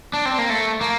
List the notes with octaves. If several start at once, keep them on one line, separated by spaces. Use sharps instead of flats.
D4
C4
A#3
A3
A#3